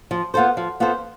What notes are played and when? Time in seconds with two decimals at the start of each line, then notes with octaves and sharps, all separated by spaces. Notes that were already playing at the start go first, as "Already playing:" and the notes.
0.11 F3
0.34 B3 F4 A4 C5
0.57 F3
0.80 B3 F4 A4 C5